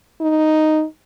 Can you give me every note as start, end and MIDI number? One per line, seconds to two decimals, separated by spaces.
0.21 0.84 63